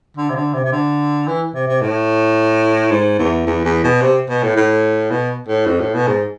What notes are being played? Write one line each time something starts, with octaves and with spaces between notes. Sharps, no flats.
D3
C3
D3
C3
C3
D3
E3
C3
C3
A2
G#2
E2
E2
E2
B2
C3
B2
A2
A2
B2
A2
F2
A2
B2
G#2